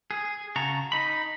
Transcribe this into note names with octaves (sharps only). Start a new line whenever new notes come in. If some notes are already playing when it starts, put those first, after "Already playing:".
G#4
C#3 F#4 A5 A#5
D#4 B5